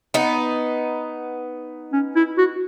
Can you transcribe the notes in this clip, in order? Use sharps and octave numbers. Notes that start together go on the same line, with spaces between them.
B3 D#4
C#4
E4
F#4